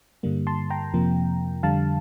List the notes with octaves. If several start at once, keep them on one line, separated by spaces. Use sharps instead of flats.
G2 D3 G3 A#3
A5 C6
G5 A#5
F2 C3 F3 A#3
F2 D3 G3 F5 A5